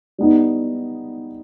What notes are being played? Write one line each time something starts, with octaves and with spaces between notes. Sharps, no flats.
G3 B3 D#4